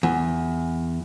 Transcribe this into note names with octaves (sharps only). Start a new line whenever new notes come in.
E2